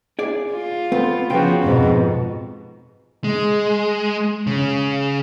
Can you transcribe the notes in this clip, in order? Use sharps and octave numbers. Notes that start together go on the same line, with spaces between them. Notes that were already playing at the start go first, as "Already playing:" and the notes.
G#4 D5
F4
A3 B3 C4
C#3 F3 B3 F4 F#4 G5
F2 G#2 B2
G#3
C#3